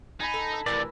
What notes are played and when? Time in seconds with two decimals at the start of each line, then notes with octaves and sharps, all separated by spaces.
0.20 D#4 G#5 A#5 B5
0.34 A4
0.52 E6
0.66 D2 A2 C3 E3 A#4 D5